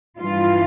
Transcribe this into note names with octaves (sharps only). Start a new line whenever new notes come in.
G2 E3 F4